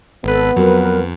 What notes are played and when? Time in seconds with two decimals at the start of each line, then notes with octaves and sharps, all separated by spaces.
0.24 G#1 B3 A4 B4
0.56 F2 F#3 A#3 A#4 B4